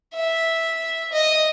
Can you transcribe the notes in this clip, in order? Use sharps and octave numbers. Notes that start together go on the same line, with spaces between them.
E5
D#5